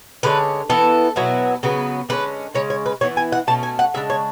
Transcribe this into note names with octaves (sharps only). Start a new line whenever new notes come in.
D3 G#3 C#4 B4
E3 B3 E4 A4
B2 F#3 B3 E4
C#3 F#3 B3
D3 G#3 C#4 B4
C#3 G#3 C#4 C#5
C#5
B4
E3 B3 E4 C#5
G#5
F#5
B2 A3 C#4 A5
G#5
F#5
C#3 G#3 D4 E5
C#5